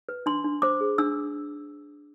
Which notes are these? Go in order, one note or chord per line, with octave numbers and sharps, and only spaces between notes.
B4
D4 C6
D4
C5 D6
G#4
D4 E6